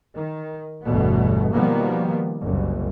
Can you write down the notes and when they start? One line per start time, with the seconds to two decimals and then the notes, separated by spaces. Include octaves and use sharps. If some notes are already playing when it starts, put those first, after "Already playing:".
0.15 D#3
0.83 G1 E2 B2 A3 B3
1.52 B2 D#3 F3 G3 A#3 B3
2.43 F#1 C2